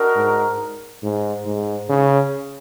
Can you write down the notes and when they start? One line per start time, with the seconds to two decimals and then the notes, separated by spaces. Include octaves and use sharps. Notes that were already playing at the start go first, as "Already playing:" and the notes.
Already playing: D4 F#4 A#4 D#5
0.16 G#2
1.03 G#2
1.46 G#2
1.89 C#3